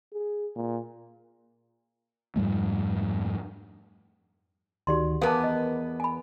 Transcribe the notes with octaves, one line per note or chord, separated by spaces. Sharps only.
G#4
A#2
F2 G#2 G3 A3
D2 D#3 F#4 G4 D5 C6
E2 B3 A#4 B4 F5 A5
D#5
G#5 B5